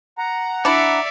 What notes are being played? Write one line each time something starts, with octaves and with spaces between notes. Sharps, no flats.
F#5 A#5
D4 E4 D5 E5 D6 C#7